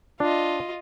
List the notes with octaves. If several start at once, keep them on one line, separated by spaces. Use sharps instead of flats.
D4 F4 D#5